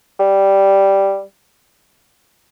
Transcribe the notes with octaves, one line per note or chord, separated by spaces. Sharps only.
G3